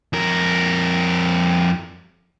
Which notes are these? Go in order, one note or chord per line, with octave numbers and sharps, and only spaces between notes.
F2 A#4